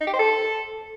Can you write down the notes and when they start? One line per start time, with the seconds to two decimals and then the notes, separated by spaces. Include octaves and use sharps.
0.01 D#4
0.07 G4
0.13 C5
0.19 A4